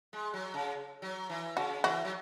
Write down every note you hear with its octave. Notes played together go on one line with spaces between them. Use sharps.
G#3
F#3
C#3
F#3
E3
C#3 F#4
E3 F#4
F#3